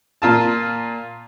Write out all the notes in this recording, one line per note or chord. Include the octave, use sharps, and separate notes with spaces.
A#2 F4 A5